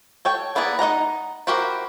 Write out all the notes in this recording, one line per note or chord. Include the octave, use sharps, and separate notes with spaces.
A4 C#5 G5
A#3 B3 E4 G#4 D5
D#4 D#5 F#5 A#5
E4 F#4 G4 A#4 C5